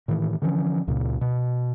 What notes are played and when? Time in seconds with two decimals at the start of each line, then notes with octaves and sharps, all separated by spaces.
0.08 A2 D#3 E3
0.42 D3 E3 F3 C#4
0.87 C#2 A#2 C#3
1.21 B2